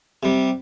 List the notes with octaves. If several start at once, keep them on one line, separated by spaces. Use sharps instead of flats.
C3 G3